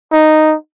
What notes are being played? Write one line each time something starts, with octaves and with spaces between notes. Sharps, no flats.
D#4